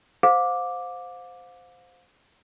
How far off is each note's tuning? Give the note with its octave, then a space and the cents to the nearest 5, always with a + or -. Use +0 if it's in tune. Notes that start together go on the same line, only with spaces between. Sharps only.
C5 -10 F5 +35 D6 +0